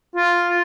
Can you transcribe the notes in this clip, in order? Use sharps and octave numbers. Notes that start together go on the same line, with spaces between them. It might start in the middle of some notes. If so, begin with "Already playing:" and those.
F4